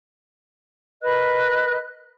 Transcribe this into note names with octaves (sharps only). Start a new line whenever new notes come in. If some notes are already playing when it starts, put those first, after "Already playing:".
A#4 B4 D#5 F#6